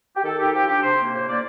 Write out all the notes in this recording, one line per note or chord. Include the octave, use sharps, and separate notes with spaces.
G4
D#3 A4
D#4 G4
F3 G4
D4 G4
C3 C5
A#3
A2 C5
A#3 D5